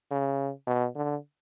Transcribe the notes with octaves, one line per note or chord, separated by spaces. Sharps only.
C#3
B2
D3